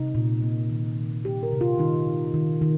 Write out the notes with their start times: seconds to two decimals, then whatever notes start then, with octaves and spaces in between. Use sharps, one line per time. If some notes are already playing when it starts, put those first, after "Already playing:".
Already playing: C3 D#4
0.15 A#2
0.42 A#3
0.69 D#3
0.97 D#3
1.24 A#3 G4
1.43 A#4
1.52 C3
1.61 F4
1.79 D#3 D#4
2.07 D#3
2.34 D#3
2.62 D#3